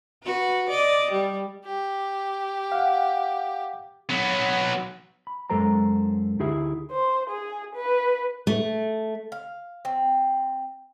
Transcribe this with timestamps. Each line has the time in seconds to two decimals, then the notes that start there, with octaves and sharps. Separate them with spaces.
0.23 F#4 B4
0.69 D5 D#5
1.12 G3
1.65 G4
2.72 F5 F#5
4.09 F#3 B3
5.27 B5
5.50 F#2 G#3 A4 C5 A#5
6.39 D2 D#4 E4 G4 G#4 E5
6.92 C5
7.30 G#4
7.75 B4
8.47 A3
9.32 F5
9.85 C4